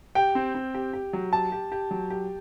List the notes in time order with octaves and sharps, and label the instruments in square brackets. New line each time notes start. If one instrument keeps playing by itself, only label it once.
[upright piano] G4 [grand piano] G5
[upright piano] C4
C4
G4
G4
F#3
[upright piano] G4 [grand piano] A5
[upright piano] G4
G4
F#3
G4